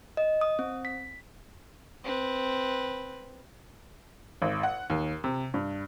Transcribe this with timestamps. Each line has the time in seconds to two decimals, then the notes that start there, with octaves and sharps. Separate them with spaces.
0.17 D#5
0.41 D#6
0.59 C4
0.85 B6
2.05 C4 B4
4.42 G#1
4.63 F#5
4.90 D#2
5.24 C3
5.54 G2